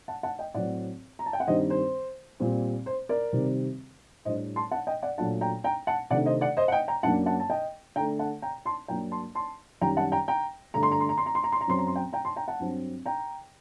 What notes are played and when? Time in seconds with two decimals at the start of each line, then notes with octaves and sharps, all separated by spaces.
0.08 F#5 A5
0.23 F#5 A5
0.39 D#5 G5
0.54 A2 F#3 C4 D5 F#5
1.19 A#5
1.26 A5
1.33 G5
1.40 F#5
1.47 G2 D#3 G3 C4 C5 D#5
1.70 C5
2.40 A#2 G3 C4
2.86 C5
3.09 A#4 D5
3.33 C3 D#3 G3 C4
4.25 A2 G3 D4 C5 D#5
4.56 A5 C6
4.71 F#5 A5
4.87 D#5 G5
5.03 D5 F#5
5.18 A#2 F#3 A3 D4 F#5 A5
5.41 G5 A#5
5.64 G5 A#5
5.87 F#5 A5
6.10 C3 D#3 A3 D4 D5 F#5
6.26 C5 D#5
6.41 D5 F#5
6.57 C5 D#5
6.68 F#5
6.72 D#5 G5
6.88 G5 A#5
7.03 F#2 F#3 A#3 D4 F#5 A5
7.26 F#5 A5
7.40 A5
7.50 D#5 G5
7.96 D3 A3 D4 G5 A#5
8.19 F#5 A5
8.42 G5 A#5
8.65 A5 C6
8.88 G2 F#3 A#3 D4 G5 A#5
9.11 A5 C6
9.35 A5 C6
9.81 F#2 D#3 G3 G5 A#5
9.97 F#5 A5
10.12 G5 A#5
10.28 G5 A#5
10.74 G2 D3 A3 D4 A#5
10.83 C6
10.92 A#5
11.00 C6
11.09 A#5
11.18 C6
11.26 A#5
11.35 C6
11.44 A#5
11.52 C6
11.61 A#5
11.67 F#2 F#3 C4 C6
11.78 A#5
11.87 C6
11.96 G5 A#5
12.13 G5 A#5
12.25 A5 C6
12.36 G5 A#5
12.48 F#5 A5
12.59 G2 F#3 C4
13.06 G5 A#5